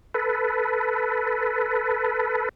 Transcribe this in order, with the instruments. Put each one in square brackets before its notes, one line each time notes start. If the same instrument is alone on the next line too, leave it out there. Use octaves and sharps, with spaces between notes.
[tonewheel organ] A4 B4